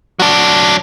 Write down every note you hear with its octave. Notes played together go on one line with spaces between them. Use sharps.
F#3 D4